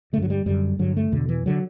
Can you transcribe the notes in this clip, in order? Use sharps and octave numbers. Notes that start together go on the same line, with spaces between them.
G2 D3 F#3 A3
G3
F#2 D3 G3
G2 D3 F#3
A3
E2 B2 D3
E3
D3 F#3